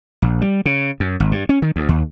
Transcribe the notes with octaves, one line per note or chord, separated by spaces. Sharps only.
A#1
G3
C#3
F#2
G#1
G2
C#4
D#3
D2
D#2